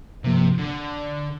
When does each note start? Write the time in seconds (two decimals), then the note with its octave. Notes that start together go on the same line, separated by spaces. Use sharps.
0.24 G2 C3 F3 A#3
0.58 D3